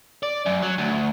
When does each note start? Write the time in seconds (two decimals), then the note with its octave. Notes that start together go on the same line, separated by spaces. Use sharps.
0.23 D5
0.46 F#2
0.62 F#3
0.78 D2